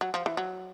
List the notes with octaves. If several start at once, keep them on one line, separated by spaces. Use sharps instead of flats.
F#3
F3
E3
F#3